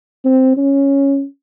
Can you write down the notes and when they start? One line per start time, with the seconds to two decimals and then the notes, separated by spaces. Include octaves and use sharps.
0.25 C4
0.57 C#4